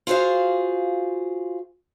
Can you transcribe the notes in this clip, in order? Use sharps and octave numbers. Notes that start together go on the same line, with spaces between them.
F4 F#4 G#4 C5 F5